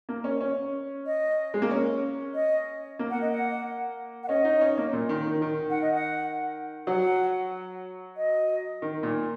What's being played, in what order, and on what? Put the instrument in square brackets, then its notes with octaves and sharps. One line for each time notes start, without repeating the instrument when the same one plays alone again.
[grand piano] A#3
C#4
C#4
[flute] D#5
[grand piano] G#3
A#3
C#4
[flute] D#5
[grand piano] A#3
[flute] F#5
D#5
F#5
F#5
[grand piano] C#4 [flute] D#5
[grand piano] D#4
C#4
A#3
A#2
D#3
D#3
D#3
[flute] F#5
D#5
F#5
[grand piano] F#3 [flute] F#5
[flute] D#5
[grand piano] D#3
A#2